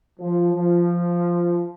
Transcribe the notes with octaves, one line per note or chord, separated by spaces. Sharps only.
F3
F3